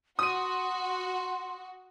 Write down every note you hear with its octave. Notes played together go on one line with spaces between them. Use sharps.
F#4 C6 D#6 D#7